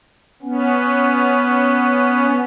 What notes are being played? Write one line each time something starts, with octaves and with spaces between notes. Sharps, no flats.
B3 C#4